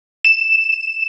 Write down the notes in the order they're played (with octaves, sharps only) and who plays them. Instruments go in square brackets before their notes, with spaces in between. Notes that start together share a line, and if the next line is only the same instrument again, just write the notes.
[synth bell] E7